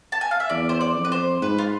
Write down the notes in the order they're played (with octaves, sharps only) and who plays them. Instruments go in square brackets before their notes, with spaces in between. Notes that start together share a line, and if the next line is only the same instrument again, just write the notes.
[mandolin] A5
G#5
F5
E5
[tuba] E2 [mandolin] D5
[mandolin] C5
D5
[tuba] F2
[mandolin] B4
C5
[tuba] G#2 [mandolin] B4
[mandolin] F4